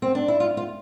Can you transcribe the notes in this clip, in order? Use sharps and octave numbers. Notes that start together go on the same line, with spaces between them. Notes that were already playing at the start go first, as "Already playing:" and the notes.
C4
D4
E4
F4
F4